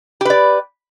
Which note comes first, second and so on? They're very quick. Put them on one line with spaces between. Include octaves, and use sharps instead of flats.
G4 B4 D5